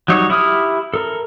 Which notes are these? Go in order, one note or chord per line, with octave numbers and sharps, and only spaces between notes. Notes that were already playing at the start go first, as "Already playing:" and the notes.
F#3 G3 D#4 C#5
E4 G4 D#6 F6
A4 A#4